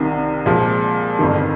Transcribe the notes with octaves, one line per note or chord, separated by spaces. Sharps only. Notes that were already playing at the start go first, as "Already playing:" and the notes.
Already playing: C2 C3 D#3
A#2 F3 G#3
G1 F2 D#3